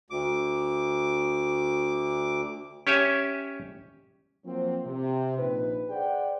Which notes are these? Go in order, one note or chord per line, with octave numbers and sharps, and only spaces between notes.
D2 D6
C#4 G4 C#5 E5 G#5
F3 F#3 A#3 C4
C3
A#1 A#2 D#4 B4
G#4 C5 D5 F#5 G5